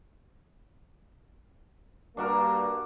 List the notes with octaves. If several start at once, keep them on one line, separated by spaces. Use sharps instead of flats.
G2 A#3 D4 F#4 A#4